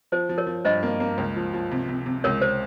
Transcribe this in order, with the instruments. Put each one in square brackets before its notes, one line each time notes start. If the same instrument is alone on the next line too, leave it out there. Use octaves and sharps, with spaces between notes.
[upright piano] F3 [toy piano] C5
[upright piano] F3
[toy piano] A#4 C#5
[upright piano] F3
[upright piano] G2 [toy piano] C5 D#5
[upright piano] A#3
A#3
C#2
F3
F3
C3
C3
C3
[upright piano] C#2 [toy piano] A#4 C#5
[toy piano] C5